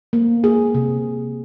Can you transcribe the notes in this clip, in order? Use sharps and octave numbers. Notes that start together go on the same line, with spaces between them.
A#3
A#3 G#4
C3